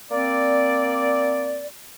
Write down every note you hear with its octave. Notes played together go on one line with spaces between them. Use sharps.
A#3 C4 D5